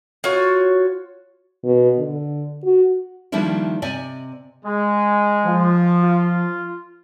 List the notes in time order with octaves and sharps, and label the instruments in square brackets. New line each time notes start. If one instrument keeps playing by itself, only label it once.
[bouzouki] F4 F#4 C#5
[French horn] B2
D3
F#4
[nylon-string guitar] D#3 F3 G3 A#3 D4 E4
C3 D5 D#5 G#5
[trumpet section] G#3
[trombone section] F3
[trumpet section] F4